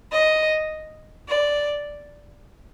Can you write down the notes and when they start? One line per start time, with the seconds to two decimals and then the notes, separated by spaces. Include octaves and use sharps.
0.11 D#5
1.29 D5